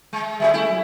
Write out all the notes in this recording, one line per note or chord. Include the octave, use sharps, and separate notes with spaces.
G#3
G3 A3 G#4 E5
A3 E4
F#3